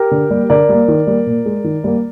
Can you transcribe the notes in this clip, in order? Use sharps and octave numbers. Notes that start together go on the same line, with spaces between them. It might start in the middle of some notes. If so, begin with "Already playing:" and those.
Already playing: G4 A#4
D3
G3 A#3
D3 A#4 D5
G3 A#3
D#3
G3 A#3
A#2
G#3
D#3
G3 A#3